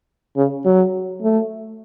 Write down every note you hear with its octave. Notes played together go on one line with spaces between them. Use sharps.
C#3
F#3
A3